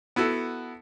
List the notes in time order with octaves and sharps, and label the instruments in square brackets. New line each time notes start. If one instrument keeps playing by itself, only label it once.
[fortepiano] B3 E4 F#4 A4